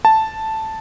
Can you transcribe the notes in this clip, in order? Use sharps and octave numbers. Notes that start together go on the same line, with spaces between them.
A5